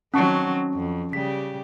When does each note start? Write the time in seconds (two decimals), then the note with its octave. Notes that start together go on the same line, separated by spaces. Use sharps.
0.14 D#3 F#3 C4 C#4 A5 C#6
0.74 F2
1.13 C#3 G3 G4 B6